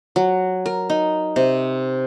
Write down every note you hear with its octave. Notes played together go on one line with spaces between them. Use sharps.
F#3
A#4
D#4
C3